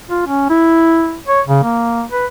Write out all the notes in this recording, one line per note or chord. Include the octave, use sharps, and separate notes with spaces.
F4
C#4
E4
C#5
C#3
A#3
B4